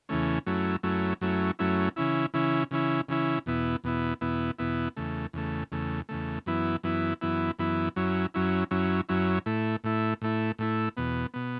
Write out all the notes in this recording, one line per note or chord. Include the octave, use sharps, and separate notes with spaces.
E2 C#3 E3 A3 C#4
F#2 F#3 A3 C#4 E4
F#2 F#3 A3 C#4 E4
F#2 F#3 A3 C#4 E4
F#2 F#3 A3 C#4 E4
C#3 E3 C#4 E4
C#3 E3 C#4 E4
C#3 E3 C#4 E4
C#3 E3 C#4 E4
E2 B2 B3 E4
E2 B2 B3 E4
E2 B2 B3 E4
E2 B2 B3 E4
E2 C#3 A3
E2 C#3 A3
E2 C#3 A3
E2 C#3 A3
F#2 E3 B3 E4
F#2 E3 B3 E4
F#2 E3 B3 E4
F#2 E3 B3 E4
F#2 F#3 C#4 E4
F#2 F#3 C#4 E4
F#2 F#3 C#4 E4
F#2 F#3 C#4 E4
A2 A3 E4
A2 A3 E4
A2 A3 E4
A2 A3 E4
E2 B2 B3
B2 B3